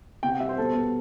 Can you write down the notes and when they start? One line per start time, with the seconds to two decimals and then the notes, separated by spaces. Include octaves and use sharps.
0.23 C3 G5
0.32 F#5
0.40 G3 E5
0.49 C5
0.58 B2 A4
0.75 B3